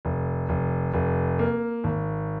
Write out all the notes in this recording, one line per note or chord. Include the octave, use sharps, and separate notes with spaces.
F1
F1
F1
A#3
G#1